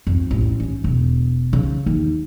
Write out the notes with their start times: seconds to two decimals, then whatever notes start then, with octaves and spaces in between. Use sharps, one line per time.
0.07 F2
0.31 A1
0.60 C#4
0.84 E1
1.53 C#3
1.86 D#2